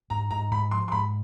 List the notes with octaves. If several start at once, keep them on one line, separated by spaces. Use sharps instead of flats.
G#2 A#5
G#2 A#5
G#2 B5
F3 C6
C6
G#2 B5